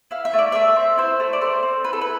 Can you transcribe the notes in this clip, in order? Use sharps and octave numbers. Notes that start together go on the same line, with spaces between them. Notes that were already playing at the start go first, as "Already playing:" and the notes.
E4 F5
E5
A3
D5
A3 E5
C4
E4 C5
A3
D5
A3 C5
C4
E4 B4
A4
B4